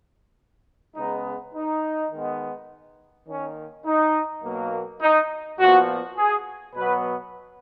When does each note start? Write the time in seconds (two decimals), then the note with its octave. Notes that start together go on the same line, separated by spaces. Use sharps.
0.96 C#3 G#3 B3 D#4
1.54 D#4
2.12 D#3 G#3 B3
3.27 D#3 A#3 C#4
3.86 D#4
4.44 B2 F#3 A#3
5.02 D#4
5.59 A#2 F3 B3 F#4
6.17 G#4
6.75 B2 F#3 B3 B4